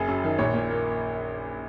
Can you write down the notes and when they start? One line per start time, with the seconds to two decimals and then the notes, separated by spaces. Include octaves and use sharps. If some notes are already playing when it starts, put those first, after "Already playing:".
Already playing: F#1 G#4
0.08 F#2
0.24 D#3
0.39 A#1 C#5
0.54 A#2
0.70 A#3